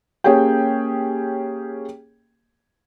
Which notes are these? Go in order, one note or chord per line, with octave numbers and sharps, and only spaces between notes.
A#3 C#4 G4 G#4 C#5 G5